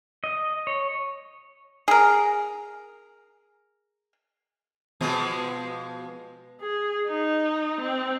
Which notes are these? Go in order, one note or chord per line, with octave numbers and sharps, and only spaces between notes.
D#5
C#5
G#4 A#4
B2 F3 G#3
G#4
D#4
C4